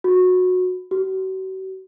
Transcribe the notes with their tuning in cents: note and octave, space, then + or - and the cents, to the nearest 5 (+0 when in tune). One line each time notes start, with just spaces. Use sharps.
F#4 -20
F#4 +40